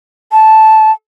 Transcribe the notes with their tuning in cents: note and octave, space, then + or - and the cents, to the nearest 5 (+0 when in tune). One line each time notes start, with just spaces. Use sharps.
A5 -10